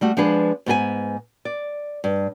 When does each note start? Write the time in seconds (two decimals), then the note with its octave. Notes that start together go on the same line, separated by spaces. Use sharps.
0.01 G3 A3 F#4
0.17 F3 G#3 D4 G#4 B4
0.66 G#2 B3 A4 G#5
1.45 D5
2.04 G2